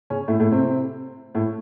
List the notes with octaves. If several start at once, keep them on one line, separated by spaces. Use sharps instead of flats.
C#3 C#4
A2 A3
A2 A3
C3 C4
A2 A3